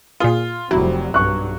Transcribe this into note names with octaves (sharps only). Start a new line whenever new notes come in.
A#2 F4 G#4
F1 F#3 G3 C4 E4
B1 G2 C#6 F#6